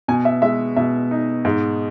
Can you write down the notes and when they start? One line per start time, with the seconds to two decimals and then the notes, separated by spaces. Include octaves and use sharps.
0.08 B2 G#5
0.25 E5
0.42 G#3 E5
0.76 B2 E5
1.11 D#4
1.45 G#2